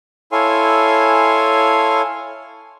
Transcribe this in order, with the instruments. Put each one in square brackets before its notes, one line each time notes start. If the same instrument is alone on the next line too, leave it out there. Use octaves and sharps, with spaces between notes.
[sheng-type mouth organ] E4 A4 C#5 F5 G#5 C6